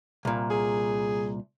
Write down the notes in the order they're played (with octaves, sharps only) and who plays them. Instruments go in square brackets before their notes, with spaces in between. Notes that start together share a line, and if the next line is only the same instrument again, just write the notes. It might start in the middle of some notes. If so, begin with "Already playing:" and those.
[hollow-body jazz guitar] C2 A#2
[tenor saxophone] G#4